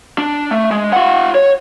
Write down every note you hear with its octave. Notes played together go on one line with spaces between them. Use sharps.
D4
A3
G#3
F4 F#5
C#5